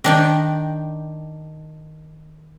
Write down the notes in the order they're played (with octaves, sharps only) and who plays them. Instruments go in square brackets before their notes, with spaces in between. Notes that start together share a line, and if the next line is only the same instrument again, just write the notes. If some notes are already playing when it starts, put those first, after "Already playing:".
[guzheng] D#3 D4 G5